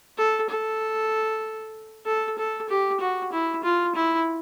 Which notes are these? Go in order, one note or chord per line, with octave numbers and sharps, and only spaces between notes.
A4
A4
A4
A4
G4
F#4
E4
F4
E4